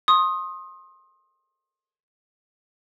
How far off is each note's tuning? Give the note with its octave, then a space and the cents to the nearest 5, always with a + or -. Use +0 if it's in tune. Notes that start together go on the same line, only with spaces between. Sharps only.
C6 +30 D#6 +0